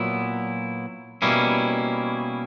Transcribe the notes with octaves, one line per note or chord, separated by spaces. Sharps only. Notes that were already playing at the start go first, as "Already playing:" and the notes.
Already playing: A#2 F#3 B3 E4
B2 G3 A#3 C#4 E4